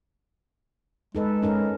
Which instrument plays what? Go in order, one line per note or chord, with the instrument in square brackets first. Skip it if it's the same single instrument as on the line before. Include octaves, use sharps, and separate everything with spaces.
[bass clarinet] G#3 [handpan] D#4 A4 B4
[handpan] C#4 D#4 A#4